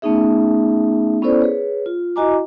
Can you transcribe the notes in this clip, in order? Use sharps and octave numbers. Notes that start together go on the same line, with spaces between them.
A3 B3 C#4 D#4 G#4 E5
B3 C#4 E4 A4 C5 D5
G#4 B4 C#5
F4
E4 F#4 D#5 G#5 A#5 D6